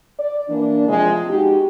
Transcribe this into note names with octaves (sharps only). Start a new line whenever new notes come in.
D5
E3 A#3 D4
C3 F3 G#3
G#3 D#4 F#4 G4